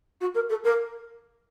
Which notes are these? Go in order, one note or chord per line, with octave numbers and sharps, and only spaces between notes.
F#4
A#4
A4
A#4